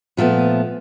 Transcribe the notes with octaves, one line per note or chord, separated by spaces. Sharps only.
A#2 F3 A3 B3